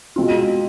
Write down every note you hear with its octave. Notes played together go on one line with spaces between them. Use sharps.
B2 G#3 C4 F4